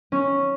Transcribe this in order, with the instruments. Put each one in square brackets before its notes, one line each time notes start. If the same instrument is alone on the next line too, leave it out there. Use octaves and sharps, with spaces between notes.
[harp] C#4